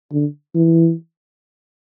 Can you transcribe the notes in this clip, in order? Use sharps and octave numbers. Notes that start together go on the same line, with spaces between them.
D3
E3